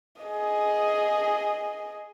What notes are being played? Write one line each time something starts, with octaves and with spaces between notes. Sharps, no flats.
G#4 D#5